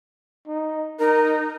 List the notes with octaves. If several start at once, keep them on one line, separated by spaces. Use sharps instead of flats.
D#4
D#4 A#4